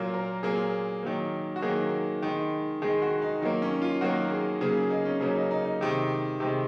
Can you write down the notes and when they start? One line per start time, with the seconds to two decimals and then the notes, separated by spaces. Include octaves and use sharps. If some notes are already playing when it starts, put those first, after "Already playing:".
Already playing: A#2 F#3 A#3 F4
0.14 A#4
0.43 A#2 F#3 A#3 G#4
1.03 D#3 F#3 A#3
1.56 F#4
1.62 D#3 F#3 A#3 G#4
2.22 D#3 G#3
2.82 D#3 G#3 G#4
3.02 F#4
3.22 D#4
3.41 D#3 F#3 A#3 D#4
3.62 C#4
3.82 F4
4.01 D#3 F#3 A#3 F#4
4.31 G#4
4.61 C#3 F#3 A#3 G#4
4.90 D#4
5.05 C#4
5.20 C#3 F#3 A#3
5.35 D#4
5.51 D#4
5.65 D#4
5.81 C3 D#3 G#3
6.40 C3 D#3 G#3